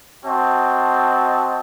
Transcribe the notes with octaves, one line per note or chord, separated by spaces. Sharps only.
C4 F#4 D#5 A5